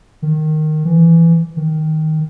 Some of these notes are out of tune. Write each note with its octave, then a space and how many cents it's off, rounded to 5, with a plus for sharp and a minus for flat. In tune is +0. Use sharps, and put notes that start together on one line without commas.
D#3 -10
E3 +15
D#3 +10